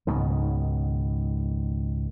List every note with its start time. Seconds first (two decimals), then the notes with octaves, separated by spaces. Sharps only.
0.07 C#2 G#2 B2 D#3